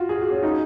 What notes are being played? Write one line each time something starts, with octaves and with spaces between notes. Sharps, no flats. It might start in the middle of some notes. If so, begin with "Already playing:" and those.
Already playing: F4 F#4
G#4
F#4
C#4
D#4